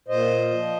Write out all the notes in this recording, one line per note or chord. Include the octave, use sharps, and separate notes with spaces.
A#2 C5 D#5
F3